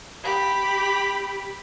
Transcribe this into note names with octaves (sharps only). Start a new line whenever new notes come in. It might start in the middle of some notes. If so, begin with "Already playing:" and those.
G4 B5